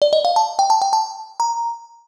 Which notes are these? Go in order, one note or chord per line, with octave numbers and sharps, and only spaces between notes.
D5
D#5
F5
A5
G5
A5
G5
A5
A#5